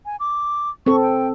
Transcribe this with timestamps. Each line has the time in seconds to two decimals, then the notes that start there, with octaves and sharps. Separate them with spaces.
0.06 G#5
0.20 D6
0.86 C4 A4 C#6
1.02 G5